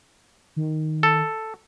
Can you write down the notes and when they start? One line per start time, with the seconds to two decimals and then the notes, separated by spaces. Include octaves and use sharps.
0.56 D#3
1.03 A4